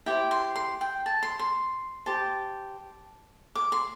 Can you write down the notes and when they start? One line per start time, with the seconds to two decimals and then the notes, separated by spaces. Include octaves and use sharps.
0.06 E4 G4 C5 G5
0.31 C6
0.56 C6
0.81 G5
1.06 A5
1.23 C6
1.39 C6
2.06 G4 C5 A5
3.55 D6
3.72 C6